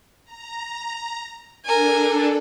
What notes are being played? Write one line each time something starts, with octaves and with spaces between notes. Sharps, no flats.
A#5
D4 A4 A#4 G#5